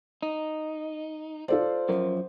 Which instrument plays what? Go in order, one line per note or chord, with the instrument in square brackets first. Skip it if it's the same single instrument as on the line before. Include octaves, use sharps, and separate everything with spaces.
[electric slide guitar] D#4
[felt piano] F4 A4 D5 [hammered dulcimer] C5
[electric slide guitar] F#2 F3 [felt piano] A#4